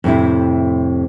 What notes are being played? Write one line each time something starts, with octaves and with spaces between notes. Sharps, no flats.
F2 A2 C3 E4